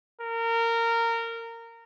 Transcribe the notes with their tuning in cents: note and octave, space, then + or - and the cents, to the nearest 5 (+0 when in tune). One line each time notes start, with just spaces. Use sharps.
A#4 -20